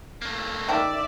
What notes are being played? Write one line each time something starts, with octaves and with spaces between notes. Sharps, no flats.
A3 A#3
D#3 D5 E5 G5 A5